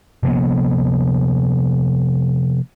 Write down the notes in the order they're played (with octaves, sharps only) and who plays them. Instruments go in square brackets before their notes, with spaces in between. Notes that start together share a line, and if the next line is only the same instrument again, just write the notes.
[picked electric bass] C3 F3 A#3 B3